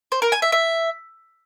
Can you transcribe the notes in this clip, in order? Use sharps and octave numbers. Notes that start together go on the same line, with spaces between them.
C5
A#4
G#5
E5
E5